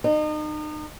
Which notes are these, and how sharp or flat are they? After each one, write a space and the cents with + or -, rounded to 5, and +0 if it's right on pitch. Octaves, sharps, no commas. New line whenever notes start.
D#4 -35